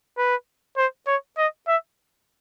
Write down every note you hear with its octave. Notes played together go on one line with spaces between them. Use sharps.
B4
C5
C#5
D#5
E5